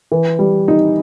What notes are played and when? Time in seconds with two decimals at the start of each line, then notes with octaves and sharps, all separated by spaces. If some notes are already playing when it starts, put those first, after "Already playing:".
0.12 E3
0.39 G3
0.68 D#4